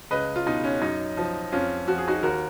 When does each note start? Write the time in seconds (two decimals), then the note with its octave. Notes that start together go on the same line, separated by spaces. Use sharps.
0.11 C#2 B4 D#5
0.36 F4
0.46 B2 D#4
0.64 C#4
0.81 F#2 D#4
1.17 F3
1.52 F2 C#4 F4
1.88 F3 F#4
1.98 G#4
2.08 D#4 F#4
2.23 D#2 F#4 A#4